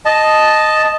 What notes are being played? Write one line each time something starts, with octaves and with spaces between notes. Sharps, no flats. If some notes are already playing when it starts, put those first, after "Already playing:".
D#5 A5